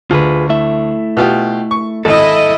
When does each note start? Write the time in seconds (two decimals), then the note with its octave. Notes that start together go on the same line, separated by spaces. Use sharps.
0.11 D2 F4 G#4 B4
0.50 A3 E4 E5
1.17 B2 F4 G4
1.71 C#6
2.05 G#1 E4 A4 D#5